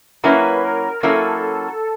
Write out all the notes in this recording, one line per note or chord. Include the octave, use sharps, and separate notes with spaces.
F#3 A#3 C#4 E4 B4
A#4
F#3 A#3 C#4 E4 A4